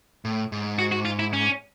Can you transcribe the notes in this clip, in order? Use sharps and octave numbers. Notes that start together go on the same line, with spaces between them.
A2
G#2
F#4
F#4
F4
E4
C#4